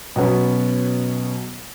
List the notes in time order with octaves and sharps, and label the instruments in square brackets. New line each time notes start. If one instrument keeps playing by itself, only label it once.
[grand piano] B2 F#3 B3 C#4